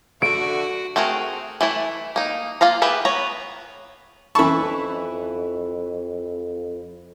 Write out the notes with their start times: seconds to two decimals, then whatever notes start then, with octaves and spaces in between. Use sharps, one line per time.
0.22 D3 A3 F#4 D7
0.96 A3 C4 F#4 G#4 A#4
1.61 E3 A3 E4
2.16 A#3 D#4
2.61 A#3 F4 F5 A#5
2.82 E4 G4 G#4 B4 E5
3.05 B3 C#5 A#5
4.35 F2 E3 C#4 E4 B4 A5 C#6